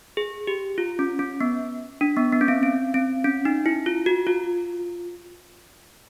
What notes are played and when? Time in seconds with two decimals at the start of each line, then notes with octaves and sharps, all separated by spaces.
0.17 G#4
0.47 G4
0.78 F4
0.99 C#4
1.19 C#4
1.41 B3
2.01 D4
2.17 B3
2.32 B3
2.41 C#4
2.48 C4
2.63 C4
2.94 C4
3.24 C#4
3.45 D#4
3.66 E4
3.86 F4
4.06 F#4
4.27 F4